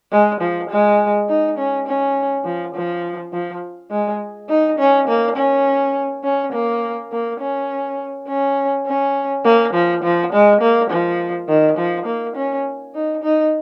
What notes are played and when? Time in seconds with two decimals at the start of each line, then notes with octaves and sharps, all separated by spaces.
0.12 G#3
0.41 F3
0.70 G#3
1.29 D#4
1.58 C#4
1.87 C#4
2.45 F3
2.75 F3
3.33 F3
3.91 G#3
4.49 D#4
4.79 C#4
5.08 A#3
5.36 C#4
6.24 C#4
6.53 A#3
7.12 A#3
7.40 C#4
8.28 C#4
8.86 C#4
9.45 A#3
9.74 F3
10.03 F3
10.33 G#3
10.61 A#3
10.91 F3
11.49 D#3
11.78 F3
12.06 A#3
12.36 C#4
12.95 D#4
13.23 D#4